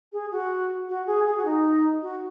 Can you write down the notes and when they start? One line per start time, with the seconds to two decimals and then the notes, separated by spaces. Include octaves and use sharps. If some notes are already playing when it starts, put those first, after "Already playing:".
0.12 G#4
0.31 F#4
0.89 F#4
1.07 G#4
1.26 G#4
1.37 F#4
1.45 D#4
2.02 F#4